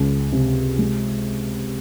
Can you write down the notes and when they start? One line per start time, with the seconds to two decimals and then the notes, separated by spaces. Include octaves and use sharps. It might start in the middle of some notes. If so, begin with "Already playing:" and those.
Already playing: C#2
0.32 C3
0.78 G#3